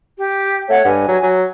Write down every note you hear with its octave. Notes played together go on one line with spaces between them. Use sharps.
G4
A3 C#5 F#5
G2 G#5
F#3
F#3